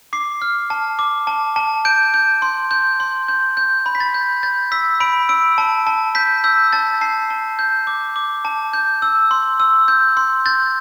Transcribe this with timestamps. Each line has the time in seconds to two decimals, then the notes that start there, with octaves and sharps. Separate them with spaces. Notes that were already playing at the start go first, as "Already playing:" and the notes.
0.13 D6 C7
0.42 F6
0.70 A5
0.99 D6
1.27 A5
1.56 A5
1.85 G6 D7
2.14 G6
2.42 C6
2.71 G6
3.00 C6
3.28 G6
3.57 G6
3.86 B5
3.95 B6
4.00 A6
4.14 G6
4.43 G6 A6
4.72 E6 B6
5.00 B5 D7
5.29 E6 D7
5.58 A5
5.87 A5
6.15 G6 B6
6.44 E6 G6
6.73 A5 A6
7.01 A5 C7
7.30 A5
7.59 G6
7.87 D6
8.16 D6
8.45 A5
8.73 G6
9.02 E6
9.31 C6
9.60 E6
9.88 G6
10.17 C6
10.46 G6 A6